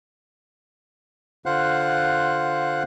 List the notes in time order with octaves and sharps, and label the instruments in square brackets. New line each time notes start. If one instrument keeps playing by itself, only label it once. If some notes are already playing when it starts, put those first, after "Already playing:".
[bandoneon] D3 F4 C5 F5 F#5 F#6